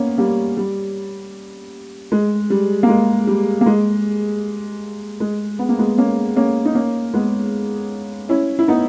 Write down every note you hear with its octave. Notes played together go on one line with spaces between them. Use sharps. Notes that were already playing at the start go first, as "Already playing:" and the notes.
Already playing: A#3 B3 C#4
G3 A#3
G3
G#3
G3
A#3
G#3
G3
A#3
G#3
G#3
B3
A#3
G#3 B3
A#3 C#4
A#3 C#4
D#4
A#3 C#4
G#3 B3
C#4 E4
E4
B3 D#4